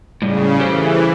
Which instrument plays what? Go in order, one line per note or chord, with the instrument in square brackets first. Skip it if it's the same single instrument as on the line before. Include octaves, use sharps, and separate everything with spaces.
[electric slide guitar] A2 G3 [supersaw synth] C#3
[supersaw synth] E3 [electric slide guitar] G4 A4 C5